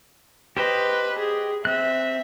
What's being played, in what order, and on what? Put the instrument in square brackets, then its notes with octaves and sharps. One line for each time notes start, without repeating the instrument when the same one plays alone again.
[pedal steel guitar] G4 C5 D#5 [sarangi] B4
[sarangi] G#4
[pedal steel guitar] C4 F#6 [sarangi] E5